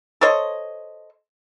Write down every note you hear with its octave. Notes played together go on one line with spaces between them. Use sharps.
A4 C5 C#5 D#5